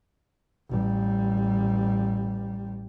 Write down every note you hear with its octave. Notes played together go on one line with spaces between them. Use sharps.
A1 G3